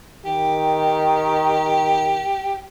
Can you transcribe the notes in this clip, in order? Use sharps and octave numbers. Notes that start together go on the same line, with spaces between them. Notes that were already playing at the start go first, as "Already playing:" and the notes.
D#3 G4